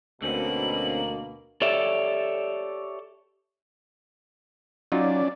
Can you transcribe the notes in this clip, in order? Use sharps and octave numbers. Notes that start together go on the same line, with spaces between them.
D2 B2 D3 A#3 C4 C#4 F#7
G4 A4 C#5 D5 E5
F#3 C#4 D#4 F4 D5